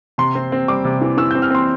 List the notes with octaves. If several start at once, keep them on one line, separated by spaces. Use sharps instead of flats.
C3 C6
C4
C4
G3 D6
C3
E3
E3 E6
C4 G6
F6
C4 C6